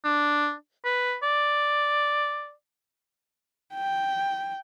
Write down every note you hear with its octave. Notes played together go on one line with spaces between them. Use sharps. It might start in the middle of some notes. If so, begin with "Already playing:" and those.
D4
B4
D5
G5